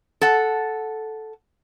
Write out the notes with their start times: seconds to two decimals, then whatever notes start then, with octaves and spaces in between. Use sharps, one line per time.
0.21 A4 F#5